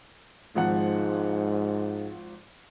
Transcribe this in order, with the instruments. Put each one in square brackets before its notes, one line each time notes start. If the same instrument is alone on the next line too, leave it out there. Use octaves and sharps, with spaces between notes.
[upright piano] G#1 F3 F#5 [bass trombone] G#2